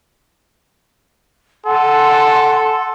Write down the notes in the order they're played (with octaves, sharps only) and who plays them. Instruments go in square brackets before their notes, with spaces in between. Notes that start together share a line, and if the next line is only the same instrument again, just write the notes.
[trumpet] A4 [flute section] F#5 G#5 C6